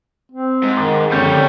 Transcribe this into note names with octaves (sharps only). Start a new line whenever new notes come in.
C4
G#2
D#3 D6 A6
F#1 F2 D3 G3 C#5 G6